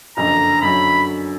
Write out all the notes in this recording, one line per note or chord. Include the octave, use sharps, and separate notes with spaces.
F#1 F2 D3 A#5
F#2 D3 F#3 B5